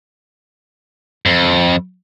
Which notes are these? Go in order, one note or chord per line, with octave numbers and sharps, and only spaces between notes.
F2